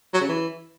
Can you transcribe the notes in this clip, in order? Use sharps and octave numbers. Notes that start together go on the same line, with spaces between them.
F#3
C#3
E3